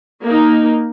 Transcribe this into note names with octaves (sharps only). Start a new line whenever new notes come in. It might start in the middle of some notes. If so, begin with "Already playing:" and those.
A#3 D#4